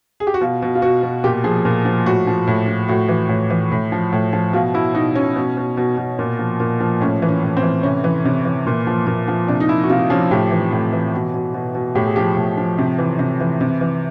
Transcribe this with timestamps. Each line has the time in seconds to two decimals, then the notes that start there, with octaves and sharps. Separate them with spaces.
0.20 G#4
0.27 G4
0.34 F#4
0.41 B2 F4
0.62 B2
0.75 F4
0.82 B2 F#4
1.03 B2
1.24 A#2 G4
1.44 F3 G#4
1.65 A#2
1.85 F3
2.06 A2 F#4
2.27 F3
2.47 A2
2.68 F3
2.88 A2 F#4
3.09 E3
3.29 A2
3.50 E3
3.72 A2
3.92 F3
4.12 A2
4.33 F3
4.53 B2 F4
4.74 B2 E4
4.94 B2 D#4
5.15 B2 C#4
5.36 B2
5.57 B2
5.77 B2
5.97 B2
6.19 A#2
6.39 F3
6.60 A#2
6.80 F3
7.00 A2 C#4
7.22 E3
7.29 C#4
7.42 A2
7.57 C4
7.63 E3
7.83 C3 C#4
8.04 E3
8.25 C3
8.45 E3
8.66 A#2
8.87 F3
9.07 A#2
9.28 F3
9.48 C3 D4
9.60 D#4
9.69 F3 E4
9.83 F#4
9.90 C3 F4
10.10 F3 C#4
10.31 A2 G4
10.51 E3
10.73 A2
10.93 E3
11.14 B2
11.34 B2
11.54 B2
11.75 B2
11.95 A2 G4
12.05 G#4
12.16 F3 G4
12.37 A2
12.58 F3
12.78 C3
12.98 E3
13.19 C3
13.40 E3
13.61 C3
13.81 E3